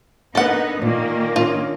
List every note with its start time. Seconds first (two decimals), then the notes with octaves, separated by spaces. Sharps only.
0.35 D3 A#3 B3 D#4 A4 F#5
0.82 A#2 D#3 A#3
1.36 C#4 D4 F4 D#5